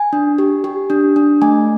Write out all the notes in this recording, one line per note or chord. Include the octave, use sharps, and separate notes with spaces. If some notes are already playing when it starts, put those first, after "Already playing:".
Already playing: G#5
D4
G4
G4
D4
D4
A3 G#5